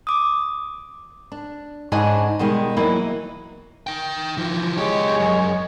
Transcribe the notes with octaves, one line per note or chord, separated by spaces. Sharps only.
D6 D#6
D4
G#2 C#3 D4 D#5 F#5 G#5
B2 D#3 G3 G#3
E3 F#3 A#3 D#4 E4
D#4 G5
E3 F3
C#2 G#3 G4 C#5
F#2